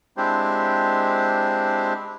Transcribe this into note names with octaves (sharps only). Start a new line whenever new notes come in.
G#3 C4 D4 E4 G4 C5